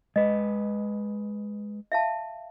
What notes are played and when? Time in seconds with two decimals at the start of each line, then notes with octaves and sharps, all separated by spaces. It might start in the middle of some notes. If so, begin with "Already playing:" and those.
0.16 G#3 B4 D#5
1.92 E5 F5 A5